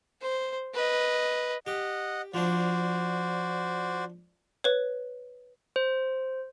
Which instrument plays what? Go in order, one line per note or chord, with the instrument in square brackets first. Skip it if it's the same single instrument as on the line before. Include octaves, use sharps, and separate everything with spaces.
[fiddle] C5
B4 D#5
[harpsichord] G4 [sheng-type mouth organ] D#5 F#5
[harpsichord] F3 D4 [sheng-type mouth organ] F#4 C5 D5
[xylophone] B4 C#5
[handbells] C5